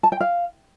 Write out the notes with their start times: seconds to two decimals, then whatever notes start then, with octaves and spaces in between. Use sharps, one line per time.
0.03 A5
0.12 G5
0.20 F5